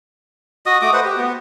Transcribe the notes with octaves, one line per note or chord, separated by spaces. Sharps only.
F#4 D#5 D#6
A3 F#4 D6 D#6
B4 C5 F#5
G4
B3